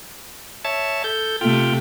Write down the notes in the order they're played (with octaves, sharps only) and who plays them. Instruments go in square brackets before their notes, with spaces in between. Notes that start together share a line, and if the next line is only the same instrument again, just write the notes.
[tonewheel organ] C#5 E5 A5
A4 G6
[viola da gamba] C3 A3 [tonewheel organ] F4 G5